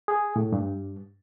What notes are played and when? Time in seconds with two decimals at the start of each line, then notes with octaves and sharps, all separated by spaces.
0.08 G#4
0.36 A2
0.52 G2